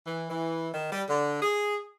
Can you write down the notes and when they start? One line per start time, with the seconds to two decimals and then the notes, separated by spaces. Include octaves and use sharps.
0.06 E3
0.30 E3
0.74 D#3
0.92 G3
1.08 D3
1.42 G#4